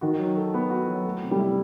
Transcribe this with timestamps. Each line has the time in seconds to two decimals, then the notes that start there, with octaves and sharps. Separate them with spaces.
0.01 D#3 F#4
0.19 F#3
0.37 A4
0.54 B3
0.70 F#4
0.88 F#3
1.05 A3
1.23 C3
1.31 G3
1.39 E4